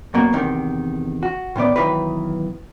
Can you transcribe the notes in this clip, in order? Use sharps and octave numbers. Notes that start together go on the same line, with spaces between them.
F#2 B2 A#3
E2 C3 D#3
F#4
A2 D#3 B3 D5
B1 E2 D#3 E3 B4